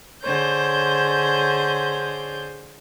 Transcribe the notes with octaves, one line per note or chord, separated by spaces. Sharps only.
D3 G#4 C5 C#5 G6